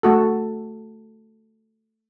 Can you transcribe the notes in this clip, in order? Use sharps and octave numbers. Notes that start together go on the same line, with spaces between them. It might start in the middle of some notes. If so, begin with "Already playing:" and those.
A3 F#4 A4